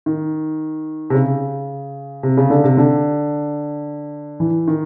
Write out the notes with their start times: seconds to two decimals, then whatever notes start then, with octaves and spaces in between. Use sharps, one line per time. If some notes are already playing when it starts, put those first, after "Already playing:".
0.06 D#3
1.10 C3
1.14 C#3
2.23 C3
2.37 C#3
2.50 D3
2.64 C3
2.77 D3
4.40 E3
4.67 D#3